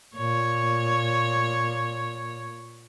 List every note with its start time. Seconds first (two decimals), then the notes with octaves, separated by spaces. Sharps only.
0.17 A#2 C#5